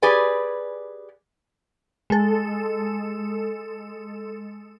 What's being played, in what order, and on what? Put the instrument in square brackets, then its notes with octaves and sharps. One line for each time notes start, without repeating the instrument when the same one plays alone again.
[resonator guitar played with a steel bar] G4 G#4 B4 D5 G#5
[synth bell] G#3 A4